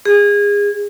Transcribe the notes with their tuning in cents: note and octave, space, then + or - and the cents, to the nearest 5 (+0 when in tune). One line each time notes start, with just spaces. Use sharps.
G#4 -25